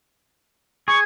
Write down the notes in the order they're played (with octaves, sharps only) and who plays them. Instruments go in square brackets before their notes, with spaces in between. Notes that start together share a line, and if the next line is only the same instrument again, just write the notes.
[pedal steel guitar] G#4 [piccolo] C#6